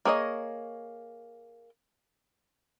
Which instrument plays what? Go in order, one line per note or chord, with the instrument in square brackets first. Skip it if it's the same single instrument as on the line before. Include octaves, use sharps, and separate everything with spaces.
[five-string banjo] A#3 G#4 C#5 D#5